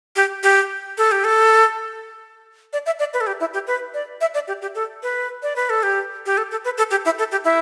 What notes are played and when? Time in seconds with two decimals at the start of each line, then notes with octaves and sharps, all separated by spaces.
0.16 G4
0.43 G4
0.98 A4
1.12 G4
1.24 A4
2.73 D5
2.86 E5
2.99 D5
3.14 B4
3.21 A4
3.27 G4
3.40 E4
3.54 G4
3.67 B4
3.94 D5
4.21 E5
4.34 D5
4.48 G4
4.62 G4
4.75 A4
5.03 B4
5.43 D5
5.56 B4
5.70 A4
5.83 G4
6.26 G4
6.37 A4
6.51 A4
6.65 B4
6.78 A4
6.91 G4
7.05 E4
7.19 A4
7.32 G4
7.44 E4